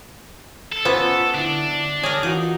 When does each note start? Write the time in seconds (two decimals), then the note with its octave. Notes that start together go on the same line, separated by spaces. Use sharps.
0.72 A4
0.85 B3 C#4 F4 B4 C5 E5
1.35 D3 D4 E4
2.03 G#4 A#4 C#5
2.23 E3 D#4 F4 F#4